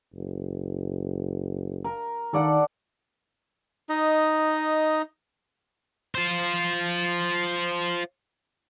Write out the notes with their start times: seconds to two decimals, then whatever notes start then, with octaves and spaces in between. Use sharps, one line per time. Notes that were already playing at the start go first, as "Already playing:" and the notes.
0.15 F#1
1.84 A#4
2.33 D#3 A4 D5 F#5
3.89 D#4 D#5
6.15 F4 C5